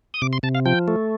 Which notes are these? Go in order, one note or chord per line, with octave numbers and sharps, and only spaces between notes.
D#6
C3 D6
C6
C3 A5
F5
F3 G5
A3